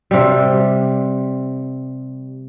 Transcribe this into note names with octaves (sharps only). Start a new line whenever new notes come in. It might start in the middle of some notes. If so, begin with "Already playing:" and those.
C3 G3